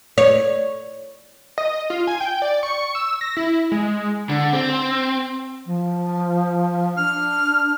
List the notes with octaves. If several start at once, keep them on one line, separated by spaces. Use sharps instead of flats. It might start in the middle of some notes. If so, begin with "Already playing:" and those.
C#5
D#5
F4
G#5
G5
D5
C#6
E6
A#6
E4
G#3
D3
C4
F3
D4 F6